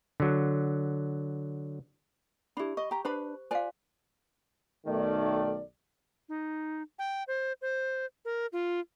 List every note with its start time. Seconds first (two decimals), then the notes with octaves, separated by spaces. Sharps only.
0.20 D3 F#3
2.57 D4 E4 G4 B5
2.77 D#5 C#6
2.91 G4 A#5
3.05 D4 B4 C5 B5
3.51 F4 C5 D5 F5 G#5
4.87 B1 D#3 A3 D5
6.29 D#4
6.99 G5
7.28 C5
7.62 C5
8.25 A#4
8.53 F4